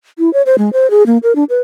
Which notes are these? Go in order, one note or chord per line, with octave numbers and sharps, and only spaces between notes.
E4
C#5
C5
G#3
C5
G#4
A#3
A#4
D4
B4